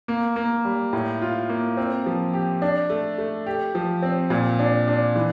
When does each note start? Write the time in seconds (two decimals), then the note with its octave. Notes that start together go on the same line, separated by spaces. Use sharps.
0.08 A#3
0.36 A#3
0.65 G3
0.93 A2
1.22 F4
1.49 A#3
1.77 C4
2.06 F3
2.34 G4
2.62 D4
2.90 A3
3.18 A3
3.46 G4
3.75 F3
4.02 C4
4.30 A#2
4.59 D4
4.88 D4
5.16 E3